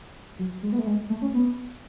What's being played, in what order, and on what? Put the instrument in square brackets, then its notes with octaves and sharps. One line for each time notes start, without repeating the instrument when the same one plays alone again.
[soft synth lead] F#3
G#3
B3
A3
G#3
A3
C#4
B3